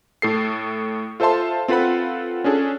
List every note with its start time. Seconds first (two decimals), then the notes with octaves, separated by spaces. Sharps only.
0.22 A2 A4 C7
1.20 F4 A4 C5 E5 A5 C6
1.68 C4 F4 A4 B4 F#5 B5
2.44 C#4 D4 G#4 A4